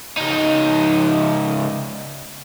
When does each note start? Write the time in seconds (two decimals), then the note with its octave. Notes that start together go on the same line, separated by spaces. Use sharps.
0.17 C#2 D#4